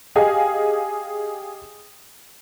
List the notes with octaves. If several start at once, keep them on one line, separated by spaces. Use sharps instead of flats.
G4 G#4 D#5 F5 G#5